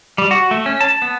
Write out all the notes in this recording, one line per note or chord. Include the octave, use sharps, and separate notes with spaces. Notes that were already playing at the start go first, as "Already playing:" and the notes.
G3
F#4
A3
C#4
A5
B3